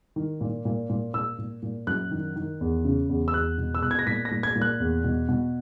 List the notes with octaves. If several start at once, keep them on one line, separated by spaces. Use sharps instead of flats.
D#3
A#2
A#2
A#2
A#2 E6
A#2
A#2
F#2 F#6
D#3
D#3
E2
C#3
E2
E6
E2 F#6
B2
E6
B2 F#6
G#6
A#6
A#2 B6
A#6
A#2
G#6
A#2
F#6
E2
B2
B2